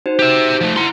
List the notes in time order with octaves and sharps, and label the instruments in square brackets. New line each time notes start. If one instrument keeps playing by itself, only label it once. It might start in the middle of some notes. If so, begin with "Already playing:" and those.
[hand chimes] D#4 F#4 C5
[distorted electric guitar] G4 E5
F3 A3
[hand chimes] E4 A#5 [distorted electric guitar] F#5 C6